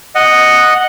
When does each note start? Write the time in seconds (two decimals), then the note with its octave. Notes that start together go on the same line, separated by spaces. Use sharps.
0.15 D#5 F#5